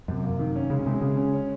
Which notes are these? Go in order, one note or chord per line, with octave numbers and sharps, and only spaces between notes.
F#2 C3
A#3
D#3
C#4
C#3 G#3
C3 G#3
C#3 G#4
C#4
C#4